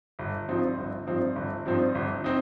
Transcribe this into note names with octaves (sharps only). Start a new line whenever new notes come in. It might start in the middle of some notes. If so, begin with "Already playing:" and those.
G1
G2 F3 C4 D#4
G1
G2 F3 C4 D#4
G1
G2 F3 C4 D#4
G1
C4 D#4